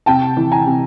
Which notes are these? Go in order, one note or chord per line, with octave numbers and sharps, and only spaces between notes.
C3 G5 A5
E3
G#5 A#5
C3